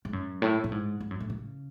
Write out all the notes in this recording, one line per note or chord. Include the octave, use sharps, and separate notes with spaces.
G#2
F#2
A2
A2
G#2
G#2
F#2
A2
C#3